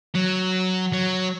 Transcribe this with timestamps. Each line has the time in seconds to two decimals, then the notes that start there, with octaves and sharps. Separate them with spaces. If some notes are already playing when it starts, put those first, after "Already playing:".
0.15 F#3
0.93 F#3